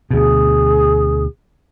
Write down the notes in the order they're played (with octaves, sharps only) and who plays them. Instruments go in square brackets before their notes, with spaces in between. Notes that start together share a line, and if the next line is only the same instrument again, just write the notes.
[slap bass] D2 B2 [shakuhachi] G#4